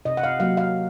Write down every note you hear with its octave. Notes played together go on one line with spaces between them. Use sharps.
C3 D#5
F#5
F5
F#3 A#3 F5
F5